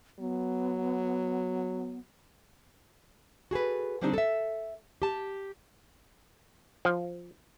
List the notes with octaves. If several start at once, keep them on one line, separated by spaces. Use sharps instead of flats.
F#3 B3
F#4 G#4 A4 B4
D3 G3 C4 D4 D#4 G4
A4 E5
G4 A5
F3